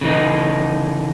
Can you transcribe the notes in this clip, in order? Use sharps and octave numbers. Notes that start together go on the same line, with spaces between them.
C#3 E3 D#4